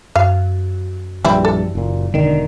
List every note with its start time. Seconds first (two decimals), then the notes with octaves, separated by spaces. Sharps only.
0.16 F#2 F5
1.25 A#1 E3 G3 C4 E4
1.45 A4
1.75 F#1 A#2
2.14 E1 D3 D#3